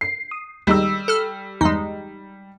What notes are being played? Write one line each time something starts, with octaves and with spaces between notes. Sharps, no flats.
C7
D#6
D#2 G3 G#3 D#4 E6
A4 F6
E2 G2 G#3 D#4